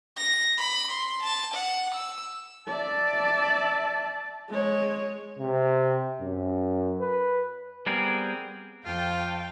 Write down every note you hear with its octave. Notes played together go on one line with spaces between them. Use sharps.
A#6
B5
C6
A5
F#5
E6
D5 E5 A5
G#3 C#5
C3
F#2
B4
G3 B3 C4 G#4 A#4
F2 F4 F5 G5 A5